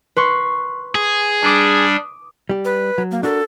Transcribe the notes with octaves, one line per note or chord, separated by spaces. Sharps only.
B4 C6 C#6
G#4
G3 D4 D6 D#6
G3 G4
B4
F#3
A#3
D4 F#4 A4 A#4